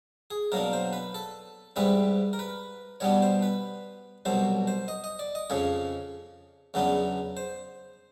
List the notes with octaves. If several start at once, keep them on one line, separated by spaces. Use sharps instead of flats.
G#4
B2 F#3 A#3 D4 A#4
C5
B4
A4
G#2 E3 G3 C4 B4
A#4
B4
B2 G3 B3 D4 C#5
C5
B4
C2 B2 F#3 C5
C5
D#5
D#5
D5
D#5
F2 C#3 F3 C#5
E2 C#3 F#3 B3 D4
C5